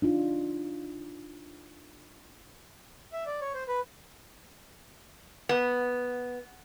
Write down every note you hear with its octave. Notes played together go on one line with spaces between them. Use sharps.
D4 D#4 F4
E5
D5
C#5
C5
B4
B3